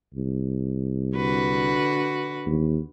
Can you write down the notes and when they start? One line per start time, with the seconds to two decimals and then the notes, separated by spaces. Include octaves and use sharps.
0.15 C2
1.15 D3 F#4 B4
2.47 D#2